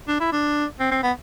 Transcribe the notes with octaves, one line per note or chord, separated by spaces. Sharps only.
D4
E4
D4
C4
C4
B3